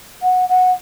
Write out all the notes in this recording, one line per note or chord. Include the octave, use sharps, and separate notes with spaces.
F#5
F#5